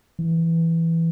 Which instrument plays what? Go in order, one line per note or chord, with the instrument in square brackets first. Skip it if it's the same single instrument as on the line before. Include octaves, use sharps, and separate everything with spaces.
[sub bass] E3